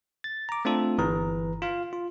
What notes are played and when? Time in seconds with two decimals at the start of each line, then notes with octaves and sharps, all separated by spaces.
0.24 A6
0.49 A#5 D6
0.65 A3 C4 D4 F4 A4
0.98 G1 E3 B4 A#5
1.62 F4 F5
1.93 F4